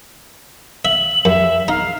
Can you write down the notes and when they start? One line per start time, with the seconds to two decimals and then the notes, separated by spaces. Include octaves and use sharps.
0.85 E5 F#7
1.25 F#2 E5
1.68 D#4 F5